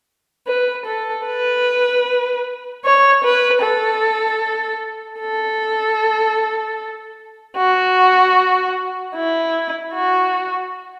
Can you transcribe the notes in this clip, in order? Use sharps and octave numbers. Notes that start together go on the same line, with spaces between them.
B4
A4
B4
C#5
B4
A4
A4
F#4
E4
F#4